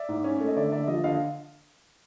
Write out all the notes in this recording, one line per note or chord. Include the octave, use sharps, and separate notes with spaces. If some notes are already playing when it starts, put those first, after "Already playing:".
Already playing: D5 E5
G#2
C#4
A3
D#5
D3 D5 E5
D3 D5 E5
F3 D#5
D3 D#5 F5